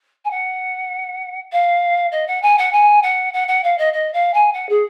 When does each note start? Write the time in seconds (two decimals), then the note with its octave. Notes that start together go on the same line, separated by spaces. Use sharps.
0.24 G#5
0.30 F#5
1.52 F5
2.11 D#5
2.27 F#5
2.42 G#5
2.58 F#5
2.72 G#5
3.02 F#5
3.33 F#5
3.48 F#5
3.63 F5
3.78 D#5
3.93 D#5
4.13 F5
4.33 G#5
4.53 F#5
4.69 G#4